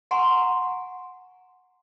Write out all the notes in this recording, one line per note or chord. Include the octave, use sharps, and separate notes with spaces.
F#5 G#5 A#5 C6 C#6